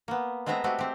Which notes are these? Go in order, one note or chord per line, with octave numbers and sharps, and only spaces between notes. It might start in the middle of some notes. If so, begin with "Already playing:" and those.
A#3 B3
G#3 A3 B3 C4 E5 A#5
G#3 A3 C4 F#4 G4
C4 G4